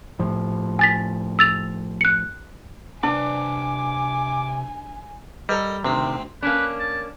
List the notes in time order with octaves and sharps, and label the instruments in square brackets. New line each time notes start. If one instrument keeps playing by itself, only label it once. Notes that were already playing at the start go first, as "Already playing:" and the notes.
[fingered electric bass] A2 F3
[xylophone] G#5 A6 B6
E6 A6 F7
F#6 C#7
[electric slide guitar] C3 B4 C#5 [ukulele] D4 [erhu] G#5 [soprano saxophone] D6
[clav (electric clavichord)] G3 [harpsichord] A4 A#4 D#5
[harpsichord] D2 C4 [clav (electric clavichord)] C3 D#3
[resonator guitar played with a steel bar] A#3 C#4 D4 [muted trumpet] B4
[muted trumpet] A5